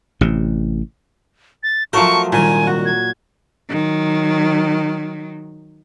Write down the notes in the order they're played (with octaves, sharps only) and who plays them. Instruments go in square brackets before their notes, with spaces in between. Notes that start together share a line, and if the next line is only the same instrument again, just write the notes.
[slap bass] A1 C3
[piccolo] A6
[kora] F3 F#3 A3 [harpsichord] A#4 D6 [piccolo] C#6
[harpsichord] C2 D#3 [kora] A#2 [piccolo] G#5
[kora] F#4
[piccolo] G#6
[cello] D#3 F#3